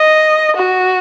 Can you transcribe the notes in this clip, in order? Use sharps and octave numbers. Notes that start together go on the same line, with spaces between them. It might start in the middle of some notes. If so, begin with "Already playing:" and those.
Already playing: D#5
F#4